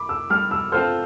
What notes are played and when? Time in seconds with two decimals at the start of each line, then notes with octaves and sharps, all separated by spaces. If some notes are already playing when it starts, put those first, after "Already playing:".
Already playing: B5 D6
0.09 E6
0.30 G3 F6
0.51 E6
0.72 C4 F4 A4 C5 F6